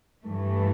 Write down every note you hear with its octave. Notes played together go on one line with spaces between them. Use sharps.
G2 E3 A3